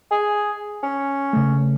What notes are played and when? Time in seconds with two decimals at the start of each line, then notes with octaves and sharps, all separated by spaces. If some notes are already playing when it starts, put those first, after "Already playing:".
0.11 G#4
0.83 C#4
1.33 C#3 A3